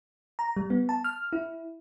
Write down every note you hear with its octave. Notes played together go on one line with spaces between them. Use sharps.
A#5
G3
B3
A5
F6
E4